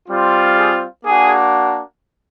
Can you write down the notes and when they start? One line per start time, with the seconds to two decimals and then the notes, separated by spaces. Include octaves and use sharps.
0.08 G3 C4 F4
0.56 G#4
1.04 A#3 D4 F#4 G#4